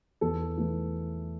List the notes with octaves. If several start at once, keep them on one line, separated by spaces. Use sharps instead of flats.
E2 A4
E3 A3